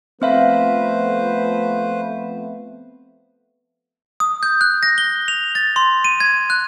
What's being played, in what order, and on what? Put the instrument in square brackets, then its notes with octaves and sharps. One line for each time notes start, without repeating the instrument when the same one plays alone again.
[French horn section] F3 A3 B3 [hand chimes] C4 E5 F5 [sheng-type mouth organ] B4 C5
[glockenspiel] D#6
G6
F#6
A#6
G7
F7
A6
C6
D#7
G#6
F#6